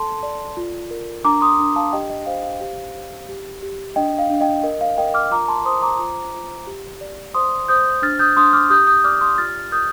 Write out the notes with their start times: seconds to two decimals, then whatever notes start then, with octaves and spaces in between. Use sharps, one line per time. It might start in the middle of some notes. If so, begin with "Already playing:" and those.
Already playing: A4 A5 C6
0.23 D5
0.57 F4
0.91 A#4
1.24 D4 A#5 D6
1.41 C6 D#6
1.59 D4
1.76 F5 A5
1.93 G4 D#5 G5
2.10 D#5
2.26 C5 F5
2.44 F5
2.61 G4
2.95 G4
3.29 G4
3.62 G4
3.96 D4 D#5 G5
4.19 F5
4.30 D4
4.41 D#5 G5
4.63 A#4 D#5
4.81 F5
4.98 A#4 D#5 G5
5.14 D6 F6
5.31 F4 A#5 D6
5.48 A5 C6
5.65 C5 C6 D#6
5.82 A#5 D6
5.99 F4
6.33 F4
6.67 G4
7.01 D5
7.34 C5 C6 D#6
7.68 C5 D#6 G6
8.02 D4 F6 A6
8.19 D#6 G6
8.37 D4 C6 D#6
8.53 D6 F6
8.70 G4 D#6 G6
8.87 D#6 G6
9.04 D5 D6 F6
9.21 C6 D#6
9.38 F4 F6 A6
9.72 A#4 D#6 G6